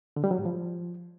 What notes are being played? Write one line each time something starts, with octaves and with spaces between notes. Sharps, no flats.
D3
G3
F#3
G#2
F3